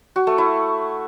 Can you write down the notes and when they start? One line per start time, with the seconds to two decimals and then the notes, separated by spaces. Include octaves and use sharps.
0.16 F#4
0.27 A3
0.38 E4